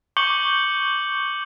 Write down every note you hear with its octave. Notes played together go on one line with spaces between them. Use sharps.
C#6 D6 G6 C#7 F#7 G7